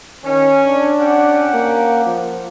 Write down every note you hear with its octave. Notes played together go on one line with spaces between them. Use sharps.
D#3 C#4
D4
C#4 G4 F#5
A#3
F3